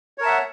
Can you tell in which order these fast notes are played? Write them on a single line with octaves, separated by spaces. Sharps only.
C#5 A#4 A5 E5 F#5